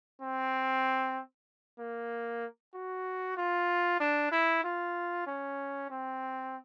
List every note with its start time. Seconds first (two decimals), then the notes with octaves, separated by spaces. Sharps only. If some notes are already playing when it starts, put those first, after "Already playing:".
0.21 C4
1.79 A#3
2.74 F#4
3.37 F4
4.00 D4
4.32 E4
4.64 F4
5.27 C#4
5.90 C4